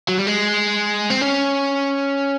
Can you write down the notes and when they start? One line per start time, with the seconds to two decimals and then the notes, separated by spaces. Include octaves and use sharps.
0.09 F#3
0.18 G3
0.27 G#3
1.10 C4
1.21 C#4